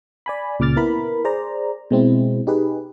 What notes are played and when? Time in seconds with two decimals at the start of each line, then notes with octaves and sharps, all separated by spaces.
0.26 D5 G#5 B5
0.59 C#2 A#2 C#3 D6 F6 A6
0.76 B3 E4 A#4 B5
1.25 G#4 C5 D5 A#5
1.91 B2 G#3 C4 E4
2.47 D#4 G4 G#4 B4